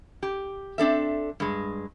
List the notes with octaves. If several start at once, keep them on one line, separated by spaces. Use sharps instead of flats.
G4
C4 D4 A4 E5
G2 G#3